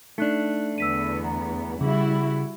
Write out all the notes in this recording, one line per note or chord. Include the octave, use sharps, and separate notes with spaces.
A3 D4 D#4 F#6
E2 D3 B3 E6 B6 D#7
A#5
C#3 G3 E4 F#4 G#4